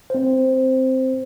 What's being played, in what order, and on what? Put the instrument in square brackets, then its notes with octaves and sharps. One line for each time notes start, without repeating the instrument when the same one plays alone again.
[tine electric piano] C4 C5